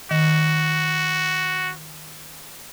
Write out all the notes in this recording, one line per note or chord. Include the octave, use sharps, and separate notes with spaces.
D#3 F#4